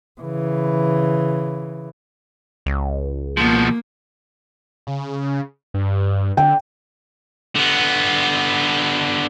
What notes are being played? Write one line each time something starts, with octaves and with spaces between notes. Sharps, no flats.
C#3 E3
C#2
B2 F3 A#3
C#3
G2
D3 G5
D3 B3